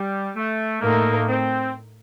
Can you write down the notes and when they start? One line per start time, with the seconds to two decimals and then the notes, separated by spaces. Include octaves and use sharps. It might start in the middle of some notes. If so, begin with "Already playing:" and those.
Already playing: G3
0.36 A3
0.81 A2 A3 A#3 D#4 A#4
1.28 C4